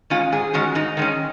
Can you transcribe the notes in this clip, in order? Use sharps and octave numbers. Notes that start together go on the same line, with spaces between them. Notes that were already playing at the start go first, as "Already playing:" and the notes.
D#3 G#3 C#4 F4
G#2 G#4
D#3 G#3 C#4 F#4
G#2 D#4
D#3 G#3 C#4